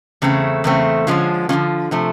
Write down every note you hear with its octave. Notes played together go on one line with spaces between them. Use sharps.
E2 C#3 A3 C4
E2 C#3 A3 C4
D3 F3 G#3 C#4 F4
D3 F3 G#3 C#4 F4
C3 F3 A3